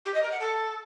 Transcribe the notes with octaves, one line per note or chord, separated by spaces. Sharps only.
G4
D#5
A#4
F#5
A4